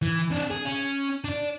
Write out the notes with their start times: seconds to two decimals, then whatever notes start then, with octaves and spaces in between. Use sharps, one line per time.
0.02 E3
0.30 C3 D4
0.50 G#4
0.65 C#4
1.25 D4 D5